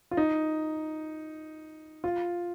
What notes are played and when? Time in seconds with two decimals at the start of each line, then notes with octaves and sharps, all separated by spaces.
0.11 F4
0.17 D#4
2.04 F4